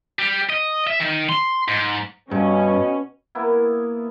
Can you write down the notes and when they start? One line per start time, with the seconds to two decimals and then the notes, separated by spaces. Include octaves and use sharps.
0.19 G3
0.49 D#5
0.87 E5
1.00 D#3
1.29 C6
1.68 G#2
2.31 G2 B2 C#4
3.35 A#3 B3 E4